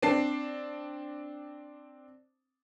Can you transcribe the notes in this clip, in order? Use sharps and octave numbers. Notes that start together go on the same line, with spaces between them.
C4 D4 A5 C7